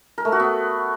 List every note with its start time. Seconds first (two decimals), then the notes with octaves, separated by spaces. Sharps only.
0.18 A#4
0.25 A3
0.32 F#4
0.40 B3